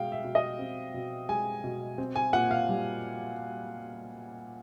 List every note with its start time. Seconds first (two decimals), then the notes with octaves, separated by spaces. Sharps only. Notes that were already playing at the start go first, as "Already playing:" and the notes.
Already playing: B2 G#3 F5 G5
0.12 E5
0.24 B2
0.35 D#5
0.59 C4
0.94 B2
1.29 G#3 G#5
1.64 B2
1.98 C4
2.16 G#5
2.33 A#2 F#5
2.51 F5
2.69 G3